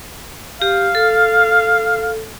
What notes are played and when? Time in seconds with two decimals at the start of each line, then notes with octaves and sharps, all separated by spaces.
0.62 G4 F5
0.95 A4